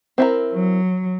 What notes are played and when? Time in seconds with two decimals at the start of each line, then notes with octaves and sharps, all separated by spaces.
0.18 C4 E4 A#4
0.53 F#3